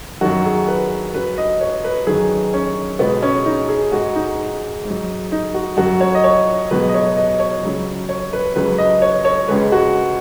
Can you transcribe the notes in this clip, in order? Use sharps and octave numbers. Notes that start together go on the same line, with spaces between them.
F#2 D#3 F#3 F#4
G#4
B4
F#2 F#3 B4
D#5
C#5
B4
F#2 D#3 F#3 G#4
C#4
C#2 B2 G#3 B3
C#4
D#4
G#4
G#2 G#3 F#4
D#4
G#2
F#3
D#4
F#4
F#2 F#3 F#4
C#5
D#5
C#5
C#2 B2 F#3 B4
D#5
C#5
D#5
C#5
C#2 C#3 F#3
C#5
B4
C#2 C#3 F#3 B4
D#5
C#5
C#5
C#2 C#3 G#3 B4
F#4